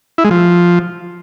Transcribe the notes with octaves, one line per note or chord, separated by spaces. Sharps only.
E4
G#3
F3